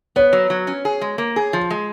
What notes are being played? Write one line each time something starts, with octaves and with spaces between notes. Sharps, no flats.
B3 C#5
F#3
F#3
C#4
G#4
G#3
A#3
G#4
F3
G#3